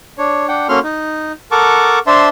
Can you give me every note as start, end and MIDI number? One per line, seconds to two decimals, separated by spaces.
0.18 0.47 62
0.18 0.47 73
0.48 0.67 62
0.48 0.67 78
0.48 0.67 79
0.69 0.79 58
0.69 0.79 61
0.69 0.79 66
0.69 0.79 69
0.69 0.79 84
0.69 0.79 89
0.83 1.32 63
1.52 1.99 69
1.52 1.99 70
1.52 1.99 78
1.52 1.99 81
1.52 1.99 85
1.52 1.99 86
2.07 2.29 62
2.07 2.29 72
2.07 2.29 76
2.07 2.29 81
2.07 2.29 84